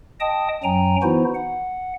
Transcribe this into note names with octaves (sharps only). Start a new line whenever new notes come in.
D#5 G5 A5 D#6
F#2 F#3 G5 G#5 A#5
E3 B3 D#4 E4 F#4 C5
F#5